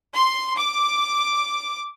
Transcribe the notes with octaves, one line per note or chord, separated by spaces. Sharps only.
C6
D6